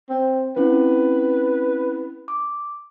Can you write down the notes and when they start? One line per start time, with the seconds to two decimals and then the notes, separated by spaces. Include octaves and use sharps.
0.10 C4
0.57 C4 C#4 E4 B4
2.28 D6